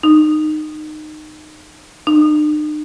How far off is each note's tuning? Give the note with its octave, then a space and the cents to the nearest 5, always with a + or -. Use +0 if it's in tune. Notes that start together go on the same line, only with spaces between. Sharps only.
D#4 -20
D#4 -45